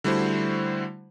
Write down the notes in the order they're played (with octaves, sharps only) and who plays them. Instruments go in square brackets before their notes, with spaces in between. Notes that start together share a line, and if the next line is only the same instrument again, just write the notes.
[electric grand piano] D3 G3 A3 E4 F#4 C5